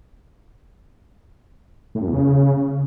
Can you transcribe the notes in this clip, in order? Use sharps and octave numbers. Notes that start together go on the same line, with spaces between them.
A2
F#2
E2
C#3